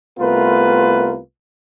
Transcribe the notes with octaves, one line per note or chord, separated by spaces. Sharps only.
C2 A3 B3 F4 A#4 B4